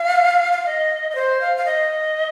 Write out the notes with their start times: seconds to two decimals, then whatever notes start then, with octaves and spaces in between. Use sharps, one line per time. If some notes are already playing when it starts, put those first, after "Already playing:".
Already playing: F5
0.53 F5
0.66 D#5
1.11 D#5
1.15 C5
1.41 F5
1.57 F5
1.66 D#5